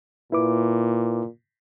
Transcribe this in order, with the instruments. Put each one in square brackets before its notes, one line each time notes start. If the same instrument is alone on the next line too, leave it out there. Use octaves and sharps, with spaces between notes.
[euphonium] A#2 [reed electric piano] E4 B4 D6